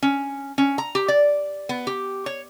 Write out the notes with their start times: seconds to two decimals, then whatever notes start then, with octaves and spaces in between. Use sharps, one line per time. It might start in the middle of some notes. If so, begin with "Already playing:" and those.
0.02 C#4
0.58 C#4
0.78 A#5
0.95 G4
1.08 D5
1.69 B3
1.87 G4
2.26 C#5